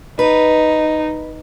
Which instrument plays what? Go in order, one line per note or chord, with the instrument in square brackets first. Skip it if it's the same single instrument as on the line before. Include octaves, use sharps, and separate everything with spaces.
[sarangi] D#4 [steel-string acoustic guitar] B4